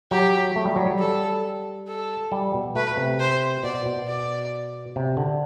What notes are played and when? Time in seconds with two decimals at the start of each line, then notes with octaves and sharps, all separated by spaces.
0.11 F#3 G4
0.56 A3
0.65 G3
0.76 F#3
0.86 G3
0.99 A4
1.88 A4
2.32 G3
2.54 B2
2.76 A3 B4
2.97 C3
3.20 C5
3.63 B2 D5
3.86 B2
4.07 D5
4.96 C3
5.17 D3